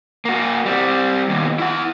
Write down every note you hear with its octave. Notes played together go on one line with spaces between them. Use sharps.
A#3 F#4
G3 C4
D#2 B2
E4 F#5